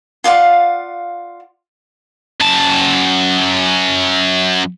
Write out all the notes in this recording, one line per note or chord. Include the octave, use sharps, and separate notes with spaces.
F4 D5 F5 F#5
F#2 A5